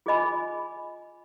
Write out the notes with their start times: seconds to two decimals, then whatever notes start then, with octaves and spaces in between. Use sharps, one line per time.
0.06 F4 G#4 D#5 G#5 B5